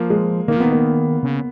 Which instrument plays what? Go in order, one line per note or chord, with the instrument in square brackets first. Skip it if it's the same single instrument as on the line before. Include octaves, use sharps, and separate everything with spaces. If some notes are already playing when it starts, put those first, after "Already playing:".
Already playing: [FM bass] F3 [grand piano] A#3
[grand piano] G#3
[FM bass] D#3 [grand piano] A#3
[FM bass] F3
[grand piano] B3
[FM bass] D#3
[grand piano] A#3
[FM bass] C#3